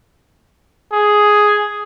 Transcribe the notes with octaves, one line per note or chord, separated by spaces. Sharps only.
G#4